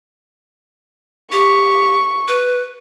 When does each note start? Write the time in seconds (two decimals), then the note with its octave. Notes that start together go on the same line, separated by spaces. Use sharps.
1.32 G4 C#6
2.28 B4